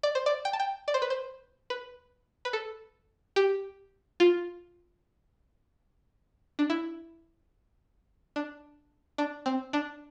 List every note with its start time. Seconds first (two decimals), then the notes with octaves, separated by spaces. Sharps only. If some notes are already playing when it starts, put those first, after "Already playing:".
0.03 D5
0.15 C5
0.26 D5
0.45 G5
0.53 A5
0.60 G5
0.88 D5
0.94 C5
1.02 B4
1.10 C5
1.70 B4
2.45 B4
2.53 A4
3.36 G4
4.20 F4
6.59 D4
6.70 E4
8.36 D4
9.18 D4
9.46 C4
9.73 D4